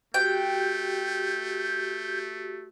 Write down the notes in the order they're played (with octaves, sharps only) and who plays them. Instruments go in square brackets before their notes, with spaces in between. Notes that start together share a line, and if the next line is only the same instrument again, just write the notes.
[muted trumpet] A3 [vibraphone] F#4 G4 [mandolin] G5 [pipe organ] G6